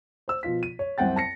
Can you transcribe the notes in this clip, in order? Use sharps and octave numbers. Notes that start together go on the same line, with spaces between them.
C5 E6
B2 F3 F4 B6
D#7
C#5
C2 F#2 C4 F#5 G5 A6
A5 A#6 C#7